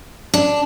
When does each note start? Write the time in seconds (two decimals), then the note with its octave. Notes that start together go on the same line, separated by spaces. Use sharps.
0.34 D4